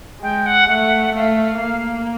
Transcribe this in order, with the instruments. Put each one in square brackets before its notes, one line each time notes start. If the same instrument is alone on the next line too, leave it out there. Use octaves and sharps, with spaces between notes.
[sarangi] G#3 [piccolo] G5
[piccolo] F#5
[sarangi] A3 [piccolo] F#5
[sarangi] A3 [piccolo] F5
[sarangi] A#3